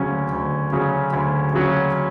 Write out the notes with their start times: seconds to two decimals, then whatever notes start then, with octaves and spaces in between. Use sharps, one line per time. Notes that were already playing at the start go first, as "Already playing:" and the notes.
Already playing: D2 C#3 F#3 C#4
0.33 D2
0.72 C#3 F#3 C#4
1.13 D2
1.54 C#3 F#3 C#4